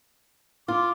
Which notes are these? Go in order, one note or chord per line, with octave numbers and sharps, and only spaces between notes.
F4 D6